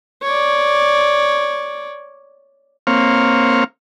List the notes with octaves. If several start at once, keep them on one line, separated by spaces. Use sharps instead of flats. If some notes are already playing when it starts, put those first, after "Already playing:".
C#5 D5
A#3 C4 C#5 F5